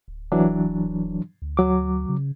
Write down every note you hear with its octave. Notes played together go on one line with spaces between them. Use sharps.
D1
E3 F#3 D4
D2
F#3 D6
C#3